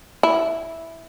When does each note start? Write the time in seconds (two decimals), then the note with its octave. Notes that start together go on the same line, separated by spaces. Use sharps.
0.23 E4